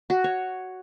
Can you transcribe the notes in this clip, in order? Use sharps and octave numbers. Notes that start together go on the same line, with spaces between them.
F#4
C#5